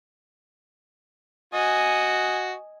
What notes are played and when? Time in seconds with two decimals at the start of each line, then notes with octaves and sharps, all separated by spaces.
1.53 F#4 D#5 G#5